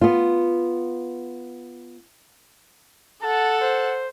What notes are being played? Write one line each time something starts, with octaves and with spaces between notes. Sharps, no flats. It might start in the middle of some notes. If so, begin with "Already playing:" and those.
B3 F4
A4 F#5 A5
C5